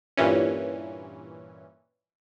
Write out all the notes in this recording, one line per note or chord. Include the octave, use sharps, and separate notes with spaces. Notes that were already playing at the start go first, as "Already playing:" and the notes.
G2 A#2 E3 C#4